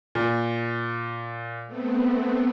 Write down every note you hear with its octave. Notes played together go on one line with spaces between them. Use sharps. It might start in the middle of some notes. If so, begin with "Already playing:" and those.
A#2
A3 B3 C4